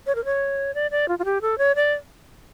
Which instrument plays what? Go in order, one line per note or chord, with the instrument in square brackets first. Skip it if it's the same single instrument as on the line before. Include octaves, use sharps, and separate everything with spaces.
[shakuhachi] C#5
A#4
C#5
D5
D5
F4
F4
G4
A4
C#5
D5